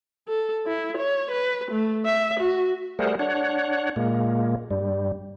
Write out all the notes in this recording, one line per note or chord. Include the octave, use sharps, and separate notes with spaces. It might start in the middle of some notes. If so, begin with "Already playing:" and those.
A4
E4
C#5
B4
A3
E5
F#4
G3 A3 G#4 A#4 C5 F#5
D4 C#5 F#5
A#2 G#3 A#3
G2 G3